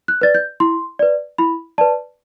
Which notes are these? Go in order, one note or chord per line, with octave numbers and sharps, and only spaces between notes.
F#6
B4 D5 A6
G6
E4 C6
B4 D5
E4 B5
B4 D5 A5